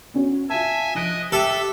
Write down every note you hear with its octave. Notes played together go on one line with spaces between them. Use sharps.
B3 C#4 F#4
F4 E5 G#5 A5
F3 D#5 F#6 D7
G4 A4 E5 E6